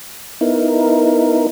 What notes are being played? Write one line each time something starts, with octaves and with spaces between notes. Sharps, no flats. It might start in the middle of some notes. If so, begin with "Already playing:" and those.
B3 D#4 E4 A#4